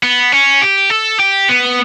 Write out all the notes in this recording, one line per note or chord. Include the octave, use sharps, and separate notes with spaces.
B3
C#4
G4
A4
G4
B3